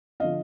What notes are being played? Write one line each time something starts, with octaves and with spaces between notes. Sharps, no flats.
D3 F3 D#5 F5